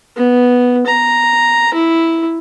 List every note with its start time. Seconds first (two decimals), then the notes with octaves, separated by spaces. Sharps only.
0.17 B3
0.87 A#5
1.74 E4